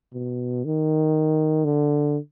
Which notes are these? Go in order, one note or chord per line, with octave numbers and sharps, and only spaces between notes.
B2
D#3
D3